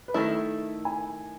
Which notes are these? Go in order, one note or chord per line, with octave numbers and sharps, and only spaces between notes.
B4
D#3 A3 E4 A4
G#5